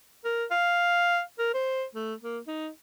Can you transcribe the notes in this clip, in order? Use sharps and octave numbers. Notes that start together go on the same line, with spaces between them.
A#4
F5
A#4
C5
A3
A#3
D#4